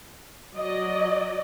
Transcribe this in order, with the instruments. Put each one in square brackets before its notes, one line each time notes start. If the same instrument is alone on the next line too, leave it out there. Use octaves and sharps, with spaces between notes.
[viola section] F#3 D5 D#5